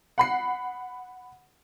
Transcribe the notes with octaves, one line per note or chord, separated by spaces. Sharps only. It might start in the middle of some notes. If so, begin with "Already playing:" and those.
F#5 B5 C7